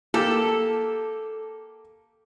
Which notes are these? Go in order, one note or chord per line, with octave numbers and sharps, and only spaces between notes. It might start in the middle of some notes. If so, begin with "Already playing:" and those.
A#3 G4 A4